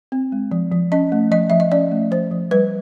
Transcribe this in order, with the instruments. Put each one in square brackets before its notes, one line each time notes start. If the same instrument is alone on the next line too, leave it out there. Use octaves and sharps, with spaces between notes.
[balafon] C4
G#3
F3
F3
C#4 D#5
A3
F3 D#5
F3 E5
D#5
C#4 D5
A3
F3 C5
F3
G3 B4